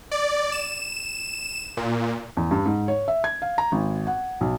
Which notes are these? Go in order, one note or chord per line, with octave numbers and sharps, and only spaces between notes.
D5
E7
A#2
E2
G2
G#2
C#5
E5
G#6
F5
A#5
G#1
F#5
B1